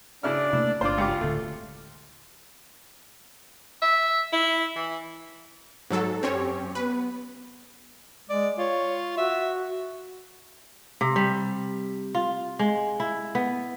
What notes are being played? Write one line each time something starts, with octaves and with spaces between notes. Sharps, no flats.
C#3 D4 E4 D5 F6
C3 A3 A#3 E4
G1 D4 F4 C5 D5
C#2 G4 D6
D1 D3 A3
E5
E4
E3
G#2 F#3 A4
F#2 C4 C#4 G4 C#5
B3 B4
G#3 D5
F4 C#5
F#4 E5
C3
G3
F4
G#3
E4
B3